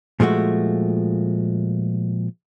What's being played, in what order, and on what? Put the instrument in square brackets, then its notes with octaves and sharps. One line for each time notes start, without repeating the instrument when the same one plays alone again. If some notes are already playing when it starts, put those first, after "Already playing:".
[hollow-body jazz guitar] A#2 F3 G#3 A3 F#4